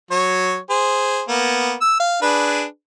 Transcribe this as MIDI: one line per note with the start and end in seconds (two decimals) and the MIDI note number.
0.11 0.58 54
0.11 0.58 73
0.70 1.21 68
0.70 1.21 72
1.29 1.74 58
1.29 1.74 59
1.81 1.97 88
2.00 2.22 77
2.22 2.64 62
2.22 2.64 68
2.22 2.64 71